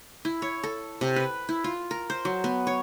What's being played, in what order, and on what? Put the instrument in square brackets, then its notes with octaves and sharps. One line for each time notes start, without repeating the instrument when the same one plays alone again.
[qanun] E4
C#5
A4
C3
B4
E4
F4
A#4
C5
F#3
B3
C#5